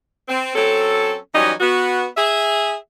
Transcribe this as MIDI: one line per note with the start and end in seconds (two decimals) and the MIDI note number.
0.28 0.51 60
0.55 1.15 54
0.55 1.15 60
0.55 1.15 61
0.55 1.15 69
1.34 1.51 52
1.34 1.51 54
1.34 1.51 55
1.34 1.51 61
1.34 1.51 63
1.34 1.51 75
1.61 2.06 59
1.61 2.06 66
2.16 2.75 68
2.16 2.75 76